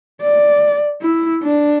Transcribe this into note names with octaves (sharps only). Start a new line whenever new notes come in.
D5
E4
D4